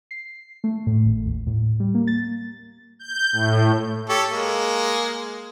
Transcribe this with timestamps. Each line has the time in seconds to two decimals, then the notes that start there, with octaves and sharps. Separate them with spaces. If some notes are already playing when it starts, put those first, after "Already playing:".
0.11 C7
0.64 A3
0.87 A2
1.05 G#1
1.26 D#2
1.47 A2
1.80 G3
1.95 A#3
2.07 A6
2.99 G6
3.32 A2
4.09 G4 A4 C#5
4.31 G#3 A#3